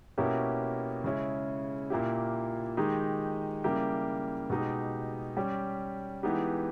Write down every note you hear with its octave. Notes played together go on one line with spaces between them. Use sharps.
B2 A#3 C#4 E4 G4
C#3 G#3 C#4 E4
A#2 A#3 E4 G4
D#3 G#3 D#4 G4
C#3 G3 A#3 E4 G4
B2 G#3 D#4 G4
G3 C#4 G4
E3 G#3 B3 D#4 G4